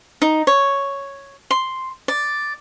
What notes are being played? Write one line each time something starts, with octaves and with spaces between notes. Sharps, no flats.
D#4
C#5
C6
D5